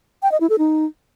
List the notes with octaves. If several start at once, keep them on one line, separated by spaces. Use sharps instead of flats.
G5
D#5
E4
A4
D#4